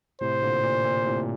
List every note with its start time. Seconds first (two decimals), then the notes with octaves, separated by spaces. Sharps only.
0.21 A2 C3 C5
0.42 A#2 D3
0.63 A#2
0.85 A#2
1.06 A2 C3